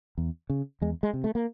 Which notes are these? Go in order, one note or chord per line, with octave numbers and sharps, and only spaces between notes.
E2
C#3
E2 G#3
G#3
C3
A3
A#3